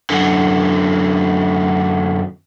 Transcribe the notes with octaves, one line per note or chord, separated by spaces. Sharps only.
F#2 D3